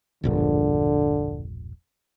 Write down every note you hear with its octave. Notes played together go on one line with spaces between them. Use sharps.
E1 A#1 G2 D3